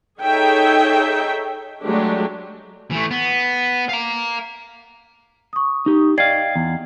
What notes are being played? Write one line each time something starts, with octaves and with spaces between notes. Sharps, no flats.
D#4 G#4 A4 C#5 E5 G5
F#3 G#3 A3 D4 G4
E3 A3
B3
F5 A#5
C#6 D#6
D#4 G4
D5 D#5 F5 G5 G#6 C7
E2